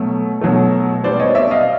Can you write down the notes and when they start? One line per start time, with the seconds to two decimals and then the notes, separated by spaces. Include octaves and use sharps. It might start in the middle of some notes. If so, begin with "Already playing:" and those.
Already playing: B2 F#3 A3
0.41 B2 F#3 A3
1.03 B2 G3 B3 C5 D5
1.20 C#5 D#5
1.35 D5 E5
1.51 D#5 F5